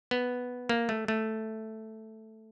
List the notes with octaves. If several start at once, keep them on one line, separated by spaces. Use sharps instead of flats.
B3
A#3
A3
A3